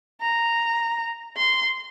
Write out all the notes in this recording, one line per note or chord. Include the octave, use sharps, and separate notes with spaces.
A#5
C6